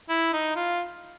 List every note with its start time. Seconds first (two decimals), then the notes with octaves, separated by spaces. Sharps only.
0.09 E4
0.33 D#4
0.56 F4